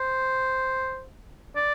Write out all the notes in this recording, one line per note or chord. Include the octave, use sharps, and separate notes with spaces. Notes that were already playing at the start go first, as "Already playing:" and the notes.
Already playing: C5
D5